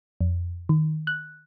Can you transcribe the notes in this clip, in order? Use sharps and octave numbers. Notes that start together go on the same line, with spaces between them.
F2
D#3
F#6